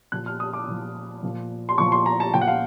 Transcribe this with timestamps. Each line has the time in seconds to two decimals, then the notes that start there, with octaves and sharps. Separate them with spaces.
0.12 A#2 F3 F#6
0.26 F6
0.40 D#6
0.54 D6
0.67 A#2 F3
1.23 A#2 F3
1.69 C6
1.78 A#2 F3 C#6
1.92 C6
2.06 A#5
2.20 A5
2.34 A#2 F3 G5
2.41 F#5
2.48 F5